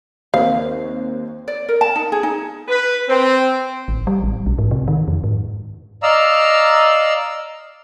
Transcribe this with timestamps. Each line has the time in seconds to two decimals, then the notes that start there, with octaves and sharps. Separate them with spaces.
0.34 D#2 C4 C#5 F5
1.48 D5
1.69 A#4
1.81 A5
1.96 D#4
2.12 G#4
2.23 D#4
2.68 B4
3.08 C4
3.88 A1
4.07 G3
4.23 A1
4.46 B1
4.58 G#2
4.71 C3
4.88 D#3
5.08 F2
5.24 G#2
6.03 D5 D#5 F5 A#5 E6